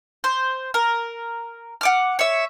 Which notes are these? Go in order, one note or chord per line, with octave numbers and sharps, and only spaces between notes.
C5
A#4
F#5 D6 F6
C#5 E5